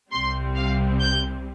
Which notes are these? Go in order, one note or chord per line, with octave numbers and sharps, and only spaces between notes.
C2 C3 G3 C4 C6
F5
G6